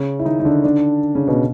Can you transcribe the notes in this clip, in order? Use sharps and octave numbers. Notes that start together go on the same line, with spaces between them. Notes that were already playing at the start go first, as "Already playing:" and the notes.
Already playing: C#3 C#4
E4
D#3 D#4
D#4
D3 D4
D3 D4
C#3 C#4
B2 B3